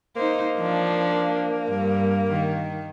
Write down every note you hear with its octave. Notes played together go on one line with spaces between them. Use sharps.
A#3 D#4 C5
F3 D4
G2
D#3